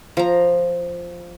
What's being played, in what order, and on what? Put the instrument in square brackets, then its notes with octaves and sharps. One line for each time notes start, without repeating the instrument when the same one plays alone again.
[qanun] F3 A#5